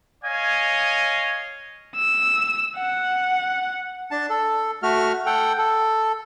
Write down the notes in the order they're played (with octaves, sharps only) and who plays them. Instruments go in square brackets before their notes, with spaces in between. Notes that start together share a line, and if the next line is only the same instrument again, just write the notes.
[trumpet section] C#5 D#5 F5 G#5
[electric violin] E6
F#5
[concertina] D4 A5
A4
A3 F#4 F6
A4 F#5 G5
A4